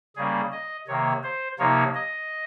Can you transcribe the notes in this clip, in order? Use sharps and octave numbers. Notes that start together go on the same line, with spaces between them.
C#3 G3 A#3 C#4 G#4
D#5
C3 D#3 A#3 C#5
C5
C3 F3 A#3 D#4 C#5
D#5